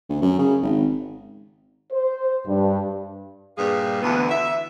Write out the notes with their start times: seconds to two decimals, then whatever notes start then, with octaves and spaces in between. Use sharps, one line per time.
0.09 D2
0.22 F#2
0.39 C#3
0.62 G#1
1.92 C5
2.47 G2
3.58 G2 A#2 G3 G#4 B4 F5
4.03 D2 E3 B3
4.29 E5